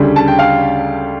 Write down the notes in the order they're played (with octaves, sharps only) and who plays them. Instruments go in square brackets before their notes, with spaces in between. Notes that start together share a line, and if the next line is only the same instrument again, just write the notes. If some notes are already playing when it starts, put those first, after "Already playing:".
Already playing: [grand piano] D2 C#3 G3
A5
G5
F5